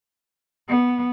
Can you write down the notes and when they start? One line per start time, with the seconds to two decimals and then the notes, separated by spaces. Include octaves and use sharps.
0.69 B3